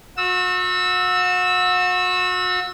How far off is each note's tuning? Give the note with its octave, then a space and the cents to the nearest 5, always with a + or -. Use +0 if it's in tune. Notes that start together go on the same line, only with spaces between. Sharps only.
F#4 -35 E6 -10